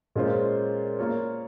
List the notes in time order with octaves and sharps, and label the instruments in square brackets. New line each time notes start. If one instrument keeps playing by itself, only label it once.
[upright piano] A#2 G#3 C#4 F4 C5
A#3 F4 A#4 C#5